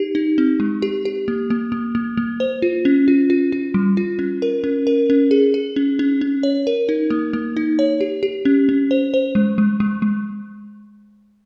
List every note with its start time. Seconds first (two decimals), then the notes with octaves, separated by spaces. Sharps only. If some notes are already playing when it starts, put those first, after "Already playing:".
Already playing: D#4 G4
0.15 D#4
0.38 C4
0.60 G#3
0.82 G4
1.05 G4
1.28 A#3
1.50 A#3
1.72 A#3
1.95 A#3
2.17 A#3
2.40 C5
2.62 F4
2.85 C#4
3.08 F4
3.30 F4
3.52 F4
3.74 G3
3.97 F4
4.19 C#4
4.42 A#4
4.64 C#4
4.87 A#4
5.10 C#4
5.31 G#4
5.54 G#4
5.76 C#4
5.99 C#4
6.21 C#4
6.43 C#5
6.67 A#4
6.89 D#4
7.10 A#3
7.33 A#3
7.57 D#4
7.79 C#5
8.01 G4
8.23 G4
8.45 C#4
8.69 C#4
8.91 C5
9.14 C5
9.35 G#3
9.58 G#3
9.80 G#3
10.02 G#3